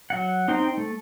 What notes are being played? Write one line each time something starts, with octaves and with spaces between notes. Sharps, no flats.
F#3 F#5
C4 D#4 C5 G5 C6
A3